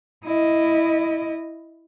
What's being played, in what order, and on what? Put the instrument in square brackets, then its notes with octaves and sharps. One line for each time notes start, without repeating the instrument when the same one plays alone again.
[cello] E4 D#5